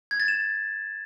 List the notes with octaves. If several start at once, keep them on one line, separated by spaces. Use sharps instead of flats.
G#6
A6
E7